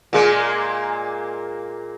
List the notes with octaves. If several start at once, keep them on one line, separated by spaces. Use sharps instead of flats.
A#2 G#3 A#3